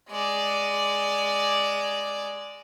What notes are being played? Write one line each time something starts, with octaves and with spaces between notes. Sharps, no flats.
G#3 D5